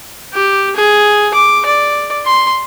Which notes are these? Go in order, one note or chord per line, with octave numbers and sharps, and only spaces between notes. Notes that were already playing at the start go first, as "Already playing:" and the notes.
G4
G#4
D6
D5
C6